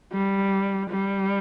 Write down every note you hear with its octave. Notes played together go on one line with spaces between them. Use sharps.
G3
G3